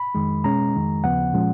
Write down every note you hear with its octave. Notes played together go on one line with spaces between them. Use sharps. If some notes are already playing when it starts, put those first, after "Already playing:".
Already playing: B5
F2 D#3 G#3
B2 G#3 C#4 A#5
F2 D#3 G#3
D#2 C#3 F3 B3 F#5
A#2 F3 G#3 C#4